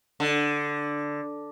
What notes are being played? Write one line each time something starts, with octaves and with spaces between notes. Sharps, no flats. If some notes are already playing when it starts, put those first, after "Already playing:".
D3